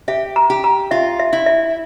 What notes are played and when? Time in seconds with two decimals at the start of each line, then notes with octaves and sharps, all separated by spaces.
0.08 G4 E5
0.36 A#5
0.50 G4
0.64 A#5
0.91 F4 E5
1.19 E5
1.33 E4
1.46 E5